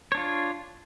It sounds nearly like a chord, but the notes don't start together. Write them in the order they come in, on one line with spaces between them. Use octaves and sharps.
C#5 D4 F4